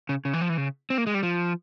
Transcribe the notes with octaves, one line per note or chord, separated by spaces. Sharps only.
C#3
C#3
E3
F3
E3
C#3
C4
A#3
G#3
G3
F3